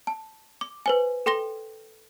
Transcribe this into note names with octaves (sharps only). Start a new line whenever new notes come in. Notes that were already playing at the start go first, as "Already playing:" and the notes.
A5
D6
B4 C5 G#5
A4 G5 C6 A#6 G7